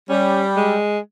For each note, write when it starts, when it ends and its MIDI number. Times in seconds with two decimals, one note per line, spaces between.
0.09 0.74 55
0.09 0.43 61
0.56 0.99 56